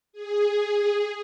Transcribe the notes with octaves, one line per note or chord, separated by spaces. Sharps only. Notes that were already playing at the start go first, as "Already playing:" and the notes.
G#4